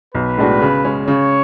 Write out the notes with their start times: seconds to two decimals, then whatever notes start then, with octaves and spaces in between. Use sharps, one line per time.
0.14 B1 B4
0.38 A2 G#3 D4 F#4
0.62 C#3
0.84 G#3 C#4
1.07 C#3 C#5